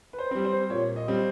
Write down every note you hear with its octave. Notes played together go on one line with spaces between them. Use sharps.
B4
C5
G3 C4
C5
A#2 C#5
D#5
G3 C4